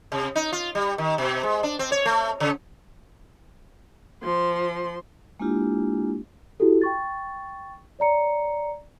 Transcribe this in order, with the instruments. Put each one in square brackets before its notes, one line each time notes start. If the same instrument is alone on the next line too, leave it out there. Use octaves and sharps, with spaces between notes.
[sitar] C3
D#4
F4
G3
D#3
B2
G#3
D4
C4
C#5
A3
C#3
[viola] F3 C6
[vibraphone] G#3 A#3 D4 E4 F4 G4
[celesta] E4 F#4 G4 A4
G5 C#6 A6
C#5 D5 A#5 C#7